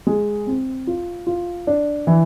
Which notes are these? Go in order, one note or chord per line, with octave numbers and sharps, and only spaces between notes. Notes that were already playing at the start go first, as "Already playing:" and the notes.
G#3
C4
F4
F4
D4
E3